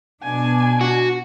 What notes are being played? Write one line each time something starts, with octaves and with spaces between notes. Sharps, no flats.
B2 D4 G#5
F#4